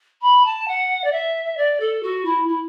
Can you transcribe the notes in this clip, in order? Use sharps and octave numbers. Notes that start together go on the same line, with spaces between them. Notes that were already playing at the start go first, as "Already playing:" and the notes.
B5
A5
F#5
D5
E5
D5
A4
F#4
E4
E4